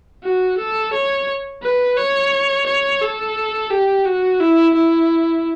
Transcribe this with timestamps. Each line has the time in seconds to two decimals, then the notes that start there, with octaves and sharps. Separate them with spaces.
0.23 F#4
0.58 A4
0.93 C#5
1.63 B4
1.97 C#5
2.66 C#5
3.01 A4
3.70 G4
4.06 F#4
4.40 E4
4.74 E4